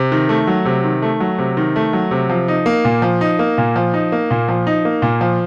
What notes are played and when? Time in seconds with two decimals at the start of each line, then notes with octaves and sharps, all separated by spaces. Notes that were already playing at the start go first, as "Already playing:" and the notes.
Already playing: C3
0.12 D#3
0.29 A3
0.47 F#3
0.65 C3
0.84 D#3
1.02 A3
1.20 F#3
1.39 C3
1.57 D#3
1.76 A3
1.93 F#3
2.11 C3
2.29 F3
2.48 D#4
2.66 A#3
2.85 A#2
3.02 F3
3.21 D#4
3.39 A#3
3.58 A#2
3.76 F3
3.94 D#4
4.12 A#3
4.31 A#2
4.48 F3
4.67 D#4
4.85 A#3
5.02 A#2
5.21 F3